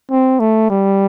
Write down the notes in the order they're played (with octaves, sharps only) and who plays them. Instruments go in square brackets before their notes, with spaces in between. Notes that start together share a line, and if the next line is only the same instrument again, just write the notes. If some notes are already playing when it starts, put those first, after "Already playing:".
[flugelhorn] C4
A3
G3